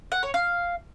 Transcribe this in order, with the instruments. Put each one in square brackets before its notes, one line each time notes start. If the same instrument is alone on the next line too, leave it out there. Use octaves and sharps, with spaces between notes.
[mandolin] F#5
C#5
F5